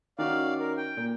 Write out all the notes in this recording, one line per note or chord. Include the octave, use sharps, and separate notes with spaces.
D#3 C#4 F#4 D5 F5
A#4
G5
A#2